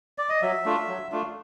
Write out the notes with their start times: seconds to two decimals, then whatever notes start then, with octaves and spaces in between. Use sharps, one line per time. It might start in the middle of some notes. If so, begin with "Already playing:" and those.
0.18 D5
0.29 D#5
0.42 F#3 E5
0.65 A3 D4 F4
0.88 F#3
1.12 A3 D4 F4